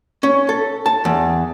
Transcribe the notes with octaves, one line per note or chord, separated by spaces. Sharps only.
C#4
A4
A5
E2